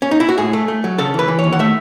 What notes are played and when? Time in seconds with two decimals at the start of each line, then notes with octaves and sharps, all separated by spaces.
0.02 C#4
0.11 D#4
0.20 E4
0.29 F#4
0.38 A2 G#4
0.53 A3
0.68 A3
0.84 F#3
0.98 C#3 A4
1.14 E3 B4
1.28 E3
1.39 C#5
1.44 D#2
1.53 F#5
1.59 A3 E5